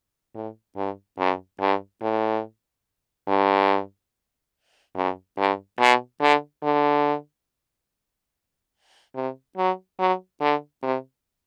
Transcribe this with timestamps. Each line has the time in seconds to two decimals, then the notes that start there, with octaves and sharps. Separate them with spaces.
0.35 A2
0.77 G2
1.18 F#2
1.61 G2
2.02 A2
3.28 G2
4.96 F#2
5.38 G2
5.80 B2
6.21 D3
6.63 D3
9.16 C3
9.58 F#3
9.99 F#3
10.41 D3
10.83 C3